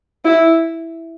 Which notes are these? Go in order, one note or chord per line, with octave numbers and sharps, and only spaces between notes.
E4